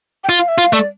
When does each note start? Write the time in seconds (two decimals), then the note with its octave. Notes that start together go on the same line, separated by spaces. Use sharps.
0.24 G5
0.29 F4 F5
0.48 E5
0.58 F4 F5
0.73 A3 D5